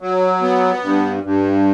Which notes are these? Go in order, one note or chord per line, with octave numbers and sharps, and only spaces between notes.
F#3
B3
G2
G2